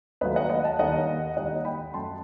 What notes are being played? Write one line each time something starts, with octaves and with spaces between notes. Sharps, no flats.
D#2 D#3 F#3 A3 B4 D#5
D#5 F#5
D#5 F#5
F#5 A5
D#2 D#3 G3 D#5 F#5
D#2 D#3 G3 D#5 F#5
G5 B5
F#2 F#3 A3 A5 C6